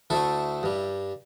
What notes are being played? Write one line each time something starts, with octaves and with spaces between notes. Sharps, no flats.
D2 D3 A3 E4 A4
G2 G3